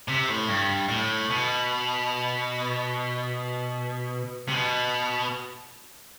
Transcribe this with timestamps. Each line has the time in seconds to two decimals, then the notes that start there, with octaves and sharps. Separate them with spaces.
0.08 C3
0.29 A2
0.49 G2
0.89 A2
1.30 B2
4.48 C3
4.54 B2